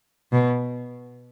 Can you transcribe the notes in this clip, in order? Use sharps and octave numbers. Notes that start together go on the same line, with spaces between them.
B2